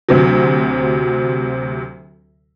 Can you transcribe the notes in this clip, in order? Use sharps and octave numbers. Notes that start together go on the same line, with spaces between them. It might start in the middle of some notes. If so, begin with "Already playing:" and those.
D2 C3 F#3